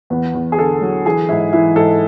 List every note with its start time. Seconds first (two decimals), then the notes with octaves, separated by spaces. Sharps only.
0.10 E2 B3
0.34 E2
0.52 G#4
0.58 D3 A4
0.81 F#3
1.06 E3 G#4
1.29 G#2 E4
1.53 E3 E4
1.76 G#2 A4